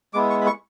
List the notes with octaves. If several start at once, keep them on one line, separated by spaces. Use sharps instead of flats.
G#3 B3 E4 D6
C#6
B5
C#6